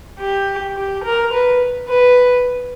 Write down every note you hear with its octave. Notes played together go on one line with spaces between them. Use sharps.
G4
G4
A#4
B4
B4